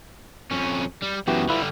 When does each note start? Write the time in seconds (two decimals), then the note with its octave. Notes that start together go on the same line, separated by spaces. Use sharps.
0.51 F2 C#4
1.03 G3
1.28 F#2 B2 E3 F#4 G4
1.49 D3 G3 E4 F4 B4